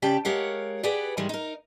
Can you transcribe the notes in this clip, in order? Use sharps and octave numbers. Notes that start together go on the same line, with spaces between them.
C#3 G4 D5 G5 A5
G#3 G4 A#4 C#5 F5 F#5
G4 G#4 B4 D5 F#5
G#2 D#3 E3 G3 G#3
D#4 A#4